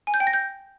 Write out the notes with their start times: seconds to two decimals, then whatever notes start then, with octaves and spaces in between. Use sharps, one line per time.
0.07 G#5
0.14 G6
0.20 G5
0.27 A#6
0.33 G6